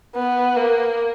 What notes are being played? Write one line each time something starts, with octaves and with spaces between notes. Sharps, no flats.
B3
A#3